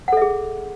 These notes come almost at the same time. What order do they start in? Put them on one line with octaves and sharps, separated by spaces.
F#5 A4 E5 G#4